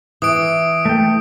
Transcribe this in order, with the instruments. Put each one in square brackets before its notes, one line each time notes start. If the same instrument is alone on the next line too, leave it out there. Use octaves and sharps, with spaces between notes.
[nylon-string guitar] E3 [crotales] D#6 D7
[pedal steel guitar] A3 G5